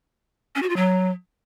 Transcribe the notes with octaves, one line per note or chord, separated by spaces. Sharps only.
C#4
F#4
F4
F#3